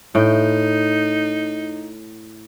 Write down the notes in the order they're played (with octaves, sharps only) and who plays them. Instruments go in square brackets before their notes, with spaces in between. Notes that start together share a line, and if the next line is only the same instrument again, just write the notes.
[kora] A2 G5 [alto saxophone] D#4